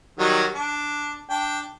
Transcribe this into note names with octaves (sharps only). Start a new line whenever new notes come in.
D#3 F#3 G3
D4
D4 G5